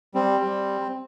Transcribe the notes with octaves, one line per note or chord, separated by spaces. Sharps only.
G3 C4
G3